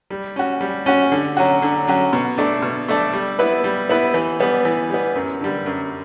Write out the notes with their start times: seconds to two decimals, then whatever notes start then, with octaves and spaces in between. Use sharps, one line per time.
0.10 G3
0.36 C#4 F#4
0.61 G3
0.86 C#4 F#4
1.12 D3
1.37 F#3 C#4 F#4
1.62 D3
1.87 F#3 C#4 F#4
2.13 B2
2.38 A3 D4 A4 D5
2.62 B2
2.88 A3 D4 A4 D5
3.13 G3
3.39 B3 E4 B4
3.64 G3
3.89 B3 E4 B4
4.14 E3
4.40 G3 B3
4.65 E3
4.90 G3 B3
5.15 F#2
5.41 D3 G3
5.66 F#2